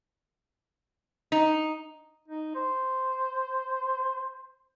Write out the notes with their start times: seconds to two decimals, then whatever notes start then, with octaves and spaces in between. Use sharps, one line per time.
1.32 D#4
2.28 D#4
2.55 C5